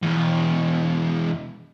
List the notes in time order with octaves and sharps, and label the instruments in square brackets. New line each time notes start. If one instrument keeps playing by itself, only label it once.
[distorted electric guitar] E2 B2